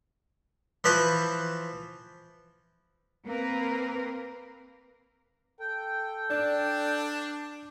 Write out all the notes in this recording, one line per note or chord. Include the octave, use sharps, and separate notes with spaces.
E3 F3 B4 C5
A#3 C4 A#4 B4
A4 G5
D4 D5